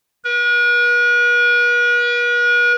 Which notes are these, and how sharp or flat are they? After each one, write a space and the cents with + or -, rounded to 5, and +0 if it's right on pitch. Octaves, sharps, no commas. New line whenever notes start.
B4 -45